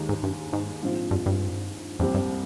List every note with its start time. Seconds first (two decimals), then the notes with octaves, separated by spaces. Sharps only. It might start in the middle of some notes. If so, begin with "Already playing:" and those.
Already playing: D#2 D#3 G#3 D#4 G4
0.09 G#2
0.23 G2
0.53 G#2
0.82 A#1 G#2 F3 C4 F4
1.11 G2
1.26 G2
1.99 C2 F2 A#2 G3 C4 G4
2.14 G2